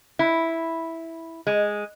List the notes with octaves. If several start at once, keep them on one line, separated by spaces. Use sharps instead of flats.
E4
G#3